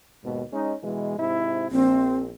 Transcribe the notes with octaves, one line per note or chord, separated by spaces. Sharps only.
D#2 G#2 B2
G#3 C#4 D#4
B2 E3 G#3
G#2 C3 E4
A#1 C4